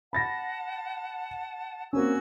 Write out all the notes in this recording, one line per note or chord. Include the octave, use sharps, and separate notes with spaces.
F#5 A5 B5 A6 A#6
A#3 C4 C#4 F#4 G#5 E6